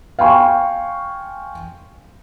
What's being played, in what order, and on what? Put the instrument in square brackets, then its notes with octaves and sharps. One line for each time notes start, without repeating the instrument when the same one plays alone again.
[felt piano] F5 G5 G#5 C6 C#6